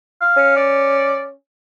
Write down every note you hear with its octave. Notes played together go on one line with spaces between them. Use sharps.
F5
C#4
D5